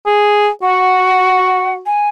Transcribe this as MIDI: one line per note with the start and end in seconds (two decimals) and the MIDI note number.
0.06 0.49 68
0.63 1.85 66
0.63 1.74 78
1.86 2.09 80